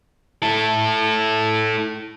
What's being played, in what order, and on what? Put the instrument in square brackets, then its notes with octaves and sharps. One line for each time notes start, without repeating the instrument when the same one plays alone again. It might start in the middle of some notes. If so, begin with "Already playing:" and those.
[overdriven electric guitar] E4 A4